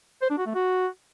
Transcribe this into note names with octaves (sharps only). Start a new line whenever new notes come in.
C5
D4
F#4
A3
F#4